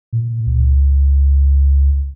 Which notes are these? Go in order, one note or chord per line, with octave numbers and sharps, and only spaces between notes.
A#2
C#2